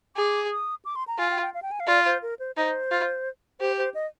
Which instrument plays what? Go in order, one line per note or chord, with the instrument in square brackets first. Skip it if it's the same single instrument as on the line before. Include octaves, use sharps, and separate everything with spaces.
[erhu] G#4 [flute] D6
[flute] D#6
D6
C6
A#5
[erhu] F4 [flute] G#5
[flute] G5
G5
F5
G5
G#5
F5
[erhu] F4 [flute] D5
[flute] C5
A#4
C5
[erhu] D#4 [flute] C5
[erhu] F4
[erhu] G4 [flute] C5
[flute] C5
D#5